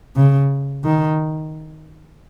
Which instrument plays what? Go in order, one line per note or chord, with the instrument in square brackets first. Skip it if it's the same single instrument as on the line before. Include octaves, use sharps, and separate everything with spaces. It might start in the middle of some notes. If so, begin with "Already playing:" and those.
[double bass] C#3
D#3